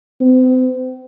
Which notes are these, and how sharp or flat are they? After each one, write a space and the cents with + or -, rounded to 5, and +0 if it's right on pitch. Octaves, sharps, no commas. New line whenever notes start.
C4 -40